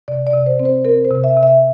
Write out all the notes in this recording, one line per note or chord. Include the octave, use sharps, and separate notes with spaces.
C3 D5
D5
C3
C5
C4
C5
C4 A#4
C5
C3
E5
C3
E5